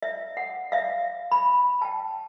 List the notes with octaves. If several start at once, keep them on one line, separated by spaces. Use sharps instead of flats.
E5
F#5
E5 F5
B5
G5 A5